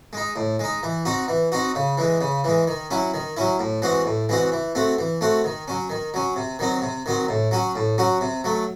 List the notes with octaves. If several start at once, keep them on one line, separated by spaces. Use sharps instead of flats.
G#3 D#4
A2
G#3 D#4
E3
C4 D#4 F#4
E3
C4 D#4 F#4
C#3
E3 G#3
C#3
E3 G#3
D#3
F#3 C#4 E4
D#3
F#3 C#4 E4
A2
E3 G#3 C4 F#4
A2
E3 G#3 C4 F#4
E3
A3 C4 F#4
E3
A3 C4 F#4
D#3
F#3 C#4
D#3
F#3 C#4
C3
D#3 F#3 C4
C3
D#3 F#3 C4
A2
F#3 C#4 F#4
A2
F#3 C#4 F#4
C3
F#3 A3